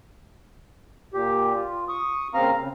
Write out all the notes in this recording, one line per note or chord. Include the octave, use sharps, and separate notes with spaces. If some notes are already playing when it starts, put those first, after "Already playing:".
A#2 G4
F4
C#6 D#6
A#2 C#3 C4 F5 A#5 F6
C#3